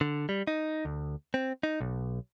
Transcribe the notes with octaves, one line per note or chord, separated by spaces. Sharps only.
D3
G3
D#4
D2
C4
D#4
B1